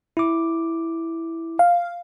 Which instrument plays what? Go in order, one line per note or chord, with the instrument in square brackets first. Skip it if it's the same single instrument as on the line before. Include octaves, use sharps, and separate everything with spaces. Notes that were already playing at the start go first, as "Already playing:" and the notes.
[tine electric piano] E4 D6
[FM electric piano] F5